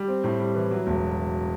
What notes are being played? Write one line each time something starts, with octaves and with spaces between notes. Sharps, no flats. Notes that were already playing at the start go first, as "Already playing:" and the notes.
Already playing: G3
C4
A2
G3
E3
F#3
E1